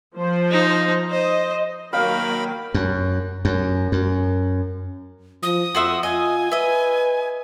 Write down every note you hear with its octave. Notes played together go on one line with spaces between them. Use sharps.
F3 C5
D#4
C5 D#5
D#3 F#3 A#3 A#4 F5 G5 B5
F#2
F#2
F#2
F3 D#6
F2 F#4 C5 E5
F4 D#5 G#5
B4 D#5 E5